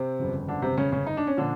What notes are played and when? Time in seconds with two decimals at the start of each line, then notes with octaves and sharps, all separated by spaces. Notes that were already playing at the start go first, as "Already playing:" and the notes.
Already playing: C3 C4
0.19 G1 F2 C#3
0.48 D3 D4
0.62 C3 C4
0.77 C#3 C#4
0.92 C#3 C#4
1.06 D#4
1.17 D4
1.27 C#4
1.37 A#2 D3 F3 D4